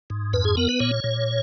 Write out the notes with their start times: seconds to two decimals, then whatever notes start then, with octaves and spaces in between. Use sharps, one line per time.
0.10 G#2
0.33 F2 B4
0.45 G#4
0.57 B3 A#4
0.69 B4
0.80 A#2 C#5
1.04 A#2